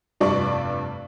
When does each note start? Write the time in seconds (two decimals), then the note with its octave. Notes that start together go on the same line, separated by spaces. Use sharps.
0.21 F1 G2 G3 D4 D5 C#6